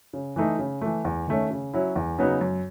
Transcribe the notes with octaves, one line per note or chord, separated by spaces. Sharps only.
C#3
E3 A3 D#4
C#3
E3 A3
E2
D#3 A3 C#4
C#3
F#3 C#4 E4
E2
C#3 F#3 B3 D#4
F#2